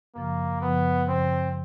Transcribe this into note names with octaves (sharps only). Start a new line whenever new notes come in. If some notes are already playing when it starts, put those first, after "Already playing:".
F#2 C#3 F3 A#3
F#2 C#3 F3 B3
F#2 C#3 F3 C4